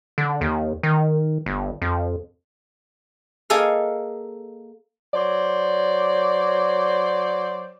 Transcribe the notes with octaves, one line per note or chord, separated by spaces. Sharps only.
D3
D#2
D#3
G1
F2
A#3 G#4 A4 D#5 F5
F#3 C5 D5